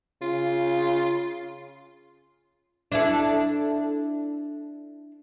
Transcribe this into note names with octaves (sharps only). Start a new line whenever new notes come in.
C#3 F4
D4 E4 A4